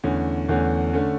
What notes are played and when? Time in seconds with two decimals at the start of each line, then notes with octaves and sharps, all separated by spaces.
0.04 E2 D3 A3 C#4
0.49 E2 D3 A3 C#4
0.93 D3 A3 C#4